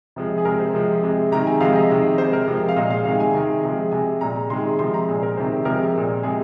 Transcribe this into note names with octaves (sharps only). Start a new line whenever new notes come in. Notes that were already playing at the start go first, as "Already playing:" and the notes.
C3 F3 G#3
G#4
C3 G#3 A#4
C5
C3 F3 G#3
C3 G#3
C3 D#3 G#3 A#5
G#5
C3 F3 G#3 F5
D#5
C3 D#3 G#3
C3 G#3 C5
A#4
C3 F3 G#3
F5
A#2 G#3 D#5
F5
C3 D#3 G#3 F5
G#5
C3 D#3 G#3
C3 F3 G#3
C3 G#3 G#5
A#2 G#3 A#5
A#5
C3 D#3 G#3 C6
C3 F3 G#3 C6
A#5
A#2 G#3 G#4
A#4
C3 D#3 G#3 C5
C3 F3 G#3 A#4
A#2 G#3
C3 G#3 G#4